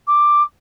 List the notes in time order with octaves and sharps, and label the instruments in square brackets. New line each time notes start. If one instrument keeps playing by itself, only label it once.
[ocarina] D6